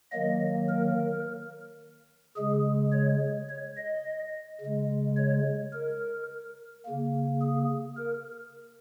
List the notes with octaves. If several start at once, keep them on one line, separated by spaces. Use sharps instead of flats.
D#3 F#3 A#3 D#5
A#4
C#3 G#3 G#4
C#5
C#5
D#5
C#3 G#3
C#5
A#4
C#3 A#3
G#4
A#4